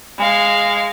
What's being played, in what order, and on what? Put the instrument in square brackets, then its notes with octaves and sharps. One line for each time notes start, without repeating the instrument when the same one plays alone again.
[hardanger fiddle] G#3 F5